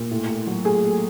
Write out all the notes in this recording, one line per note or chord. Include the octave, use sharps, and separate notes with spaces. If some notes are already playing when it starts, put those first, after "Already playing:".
Already playing: A#2
A2
A2
F#3
A3 G#4
A3